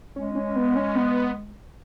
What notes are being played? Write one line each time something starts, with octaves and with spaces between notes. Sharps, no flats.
G#3 C#4
C#4
B3
C#4
B3